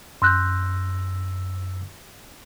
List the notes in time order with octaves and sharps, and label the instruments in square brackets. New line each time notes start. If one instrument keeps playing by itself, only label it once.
[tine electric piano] F#2 E6 A#6 [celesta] C6 F#6 G6